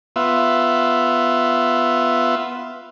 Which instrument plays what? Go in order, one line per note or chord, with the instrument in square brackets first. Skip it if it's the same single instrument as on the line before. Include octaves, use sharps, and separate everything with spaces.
[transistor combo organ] B3 F4 E5